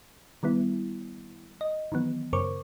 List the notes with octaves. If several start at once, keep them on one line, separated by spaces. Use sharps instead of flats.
D#3 G3 B3 E4
D#5
D#3 E3 F#3 B3
F#2 C#3 A#4 C5 C#6 D6